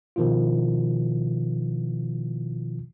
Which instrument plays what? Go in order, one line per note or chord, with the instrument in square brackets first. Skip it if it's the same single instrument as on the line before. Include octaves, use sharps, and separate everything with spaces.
[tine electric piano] B2 D#3 F3 E4 F4